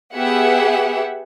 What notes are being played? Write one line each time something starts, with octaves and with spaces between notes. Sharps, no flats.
B3 G4 G#4 E5 F#5